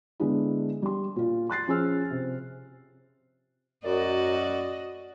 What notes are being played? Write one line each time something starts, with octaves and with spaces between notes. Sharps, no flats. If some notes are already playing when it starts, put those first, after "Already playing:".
D3 G#3 B3 D4 E4
G3 C6
A#2 F4
C6 F#6 A6 C7
F3 C#4 G#4 E6 F6
C3
F#2 F#4 D5 D#5